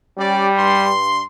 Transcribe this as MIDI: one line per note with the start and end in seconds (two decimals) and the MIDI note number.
0.18 0.91 55
0.18 0.47 61
0.18 0.47 67
0.18 0.47 74
0.57 1.22 43
0.57 1.22 84